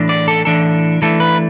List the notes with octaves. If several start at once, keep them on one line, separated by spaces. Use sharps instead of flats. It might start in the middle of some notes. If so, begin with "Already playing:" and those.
Already playing: A2 E3 D4
D5
A4
A2 E3 D4 A4
E3 A3 D4 A4
B4